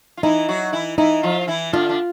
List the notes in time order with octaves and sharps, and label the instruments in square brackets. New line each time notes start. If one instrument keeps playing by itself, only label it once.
[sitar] F4
[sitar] E3 E4 [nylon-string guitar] D#4
[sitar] F#3 F#4
E3 E4
[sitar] E3 E4 [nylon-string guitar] D#4
[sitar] F3 F4
E3 E4
[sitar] D3 D4 [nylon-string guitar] F4
[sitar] D4